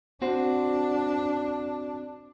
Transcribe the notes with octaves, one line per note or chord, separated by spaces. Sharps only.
C4 D4 F#4 C5